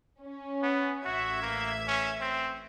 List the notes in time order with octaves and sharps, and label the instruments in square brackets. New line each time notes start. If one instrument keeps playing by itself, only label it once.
[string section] C#4
[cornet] B3
[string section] A1 E5 G#6 [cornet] F#4
[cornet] A#3
C#4
C4